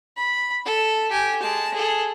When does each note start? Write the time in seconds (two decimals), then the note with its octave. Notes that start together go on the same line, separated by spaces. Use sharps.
0.17 B5
0.65 A4
1.12 G4 G#5
1.42 G#3 A5
1.74 G#4 A4